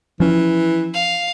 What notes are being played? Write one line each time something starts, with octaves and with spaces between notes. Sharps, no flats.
E3 F3 C#4
F5